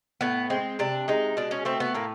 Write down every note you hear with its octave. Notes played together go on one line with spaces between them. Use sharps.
A2 B3
G#3 C4
C3 D4
G#3 D#4
B2 D4
C#4
A3 C4
B3
A2 A#3